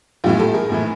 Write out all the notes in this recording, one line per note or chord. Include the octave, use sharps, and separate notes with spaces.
A#1 A2 E3 F4 G4
G4 A4
G#4 A#4
A#1 A2 E3